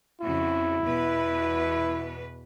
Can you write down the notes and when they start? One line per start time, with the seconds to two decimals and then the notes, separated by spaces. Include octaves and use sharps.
0.21 F2 C#3 E4 F#4
0.83 E2 B2 B4